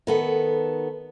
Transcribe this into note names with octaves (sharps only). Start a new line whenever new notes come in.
D#3 B3 A4